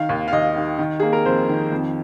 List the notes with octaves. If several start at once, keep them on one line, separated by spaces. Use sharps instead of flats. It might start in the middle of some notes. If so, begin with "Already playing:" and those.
Already playing: D#3 F5
D#2
F5
D#2 D#5
D#3
D#3
A#3 G#4
A#4
F2 C5
D#3
F2